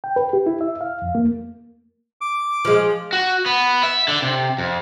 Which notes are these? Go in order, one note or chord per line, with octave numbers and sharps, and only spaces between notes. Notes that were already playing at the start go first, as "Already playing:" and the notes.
G5
B4
G4
E4
E5
F5
F2
A#3
D6
F3 G#3
F#4
B3
E5
D3
C3
F2